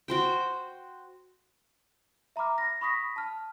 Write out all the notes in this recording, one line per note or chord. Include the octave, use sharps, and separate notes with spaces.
F#4 C5 G5
E5 A#5 B5 D6 F6
A#6
B5 C#6 D#6 A#6 B6
A5 F6